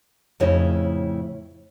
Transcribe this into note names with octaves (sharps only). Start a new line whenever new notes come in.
F2 A2 C#3 E4 C#5 D#5